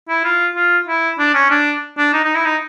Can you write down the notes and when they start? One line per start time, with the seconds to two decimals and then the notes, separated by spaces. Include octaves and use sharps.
0.09 E4
0.24 F4
0.56 F4
0.88 E4
1.19 D4
1.34 C#4
1.51 D4
1.98 D4
2.14 D#4
2.25 D#4
2.35 E4
2.45 D#4